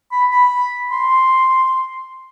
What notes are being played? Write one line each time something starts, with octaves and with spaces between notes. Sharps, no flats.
B5
B5
C6